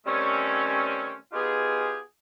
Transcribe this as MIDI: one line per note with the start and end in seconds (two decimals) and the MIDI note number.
0.06 1.14 51
0.06 1.14 55
0.06 1.14 57
0.06 1.14 60
0.06 1.14 61
1.33 1.98 59
1.33 1.98 63
1.33 1.98 65
1.33 1.98 67
1.33 1.98 68